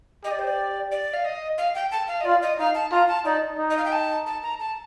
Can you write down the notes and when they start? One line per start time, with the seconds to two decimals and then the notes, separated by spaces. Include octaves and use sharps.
0.24 G4 D#5
0.32 D5
0.39 C5
0.47 D5
0.92 D5
1.14 F5
1.25 D#5
1.58 F5
1.75 G5
1.91 A5
2.08 F5
2.21 D#5
2.25 F4 D5
2.42 D#5
2.59 D#4 F5
2.75 A5
2.92 F4 A#5
3.08 A5
3.25 D#4 D5
3.59 D#4
3.70 D#5
3.78 F5
3.85 G5
3.92 A5
4.26 A5
4.43 A#5
4.60 A5